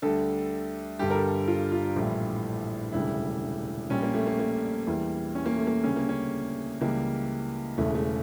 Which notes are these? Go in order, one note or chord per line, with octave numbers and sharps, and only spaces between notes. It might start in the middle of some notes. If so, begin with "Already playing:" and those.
D2 D3 G3 A4
G1 G2 D3 G3 G4
A#4
A4
F4
F4
A#1 A2 E3 G3
E1 D2 C#3 G3 E4
A#1 A#2 G3 C#4
A#3
A3
A#3
A#3
E2 E3 G3
C#4
A#3
A3
A#3
D2 C#3 G3 C#4
A#3
C#4
C#2 C#3 E3 G3 A#3
E1 E2 C#3 E3 A3
A3